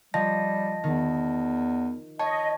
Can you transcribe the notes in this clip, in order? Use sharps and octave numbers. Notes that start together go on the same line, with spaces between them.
F3 G3 D#5 A5 A#6
E2 D#3
C#5 D#5 A5